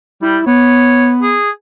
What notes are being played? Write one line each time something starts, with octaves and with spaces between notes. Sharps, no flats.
G3 E4
B3 C#5
G#4